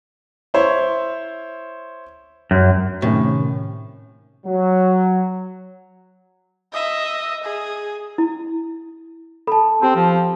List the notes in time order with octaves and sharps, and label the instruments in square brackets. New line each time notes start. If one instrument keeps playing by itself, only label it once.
[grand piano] E4 C5 C#5
[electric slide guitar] F#2
[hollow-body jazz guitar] A2 [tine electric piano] C3 D#3 C#4
[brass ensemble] F#3
[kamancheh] D#5 E5
G#4
[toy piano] E4
[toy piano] A4 [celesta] A5 B5
[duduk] C4 [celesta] G4 [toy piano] A5
[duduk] F3